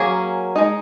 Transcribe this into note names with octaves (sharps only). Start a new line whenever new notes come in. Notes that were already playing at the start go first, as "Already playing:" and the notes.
Already playing: F#3 A#3 C#4 G#4
G#3 D#4